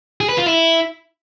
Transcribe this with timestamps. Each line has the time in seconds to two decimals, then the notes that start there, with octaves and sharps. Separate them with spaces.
0.21 G#4
0.29 B4
0.38 F4
0.46 E4